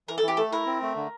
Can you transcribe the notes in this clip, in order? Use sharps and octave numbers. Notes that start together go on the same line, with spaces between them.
E3 A#4
A4
E3
G4
A3 A4
E4 A#4
C4
A3
D3